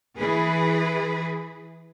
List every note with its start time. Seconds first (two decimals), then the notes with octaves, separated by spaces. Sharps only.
0.16 E3 G#4 B4